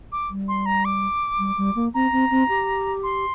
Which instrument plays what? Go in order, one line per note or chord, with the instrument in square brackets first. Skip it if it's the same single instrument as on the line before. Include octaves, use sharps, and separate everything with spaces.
[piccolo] D6
[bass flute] G3
[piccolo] C6
A#5
D6
[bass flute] G3
G3
A#3
[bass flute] C4 [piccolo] A#5
[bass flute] C4
C4
G4
[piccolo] C6